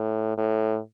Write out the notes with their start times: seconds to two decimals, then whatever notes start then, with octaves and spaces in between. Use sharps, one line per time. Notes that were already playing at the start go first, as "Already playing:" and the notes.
Already playing: A2
0.37 A2